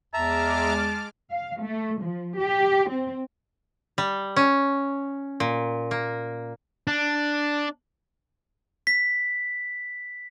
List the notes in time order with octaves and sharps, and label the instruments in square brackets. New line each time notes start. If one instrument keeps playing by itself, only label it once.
[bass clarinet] E2 [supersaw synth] G#3 D6 F6 [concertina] E5 A#5 [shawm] A5
[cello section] F5
A3
F3
G4
C4
[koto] G3
C#4
A#2
A#3
[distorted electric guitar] D4
[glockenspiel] B6